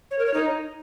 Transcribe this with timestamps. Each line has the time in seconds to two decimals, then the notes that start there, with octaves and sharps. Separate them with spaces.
0.11 C#5
0.19 A#4
0.26 C#5
0.34 D#4